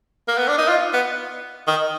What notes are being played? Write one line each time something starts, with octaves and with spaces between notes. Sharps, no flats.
A#3
B3
D4
D#4
F4
B3
D#3